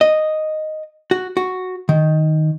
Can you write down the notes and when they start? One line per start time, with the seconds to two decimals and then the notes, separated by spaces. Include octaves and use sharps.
0.01 D#5
1.11 F#4
1.37 F#4
1.89 D#3